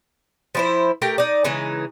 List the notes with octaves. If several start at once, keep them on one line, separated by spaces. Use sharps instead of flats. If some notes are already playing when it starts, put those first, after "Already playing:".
F3 E4 C5
A3 G4 A#4 G5
D#4 D5
C#3 E3 G#3 D#4